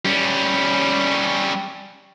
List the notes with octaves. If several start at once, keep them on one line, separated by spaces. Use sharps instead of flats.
G3 C#4